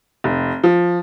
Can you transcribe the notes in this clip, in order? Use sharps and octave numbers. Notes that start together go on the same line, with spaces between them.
F1
F3